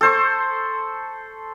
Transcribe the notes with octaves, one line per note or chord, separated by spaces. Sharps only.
A4 C5 C#6